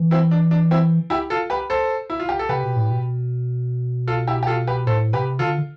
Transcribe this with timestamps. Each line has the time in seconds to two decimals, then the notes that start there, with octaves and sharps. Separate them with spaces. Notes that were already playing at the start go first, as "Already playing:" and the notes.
Already playing: E3
0.11 C4 E4
0.31 D4
0.51 D4
0.71 C4 E4
1.10 E4 G4
1.30 F4 A4
1.50 G4 B4
1.70 A4 C5
2.10 E4
2.20 F4
2.29 G4
2.39 A4
2.49 C3 G4 B4
2.63 B2
2.76 A2
2.90 B2
4.08 F4 A4
4.28 E4 G4
4.43 G4
4.47 F4 A4
4.67 G4 B4
4.86 A2 A4 C5
5.13 C3 G4 B4
5.39 D3 F4 A4